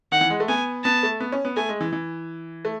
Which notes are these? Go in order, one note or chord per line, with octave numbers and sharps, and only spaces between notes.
D#3 F#5
E3
G#3
A3
B3 G#5
B3 A5
A3
B3
C#4
B3
A3 G#5
G#3
E3
E3
A3